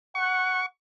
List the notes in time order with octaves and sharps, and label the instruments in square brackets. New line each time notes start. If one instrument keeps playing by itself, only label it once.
[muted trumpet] F#5 [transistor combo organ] C#6